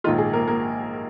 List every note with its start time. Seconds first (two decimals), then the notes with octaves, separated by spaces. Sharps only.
0.04 A#1 G#2 D#3 A#3 D#4 F4
0.18 G#4
0.33 A#3 A#4
0.48 A#3 A#4